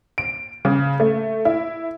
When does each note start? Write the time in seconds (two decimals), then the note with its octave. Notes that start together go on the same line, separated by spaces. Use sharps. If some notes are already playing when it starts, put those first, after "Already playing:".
0.18 D7
0.65 C#3
1.00 A3
1.45 E4